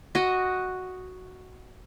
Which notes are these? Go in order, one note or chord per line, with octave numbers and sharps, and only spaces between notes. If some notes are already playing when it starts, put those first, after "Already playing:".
F#4 D#5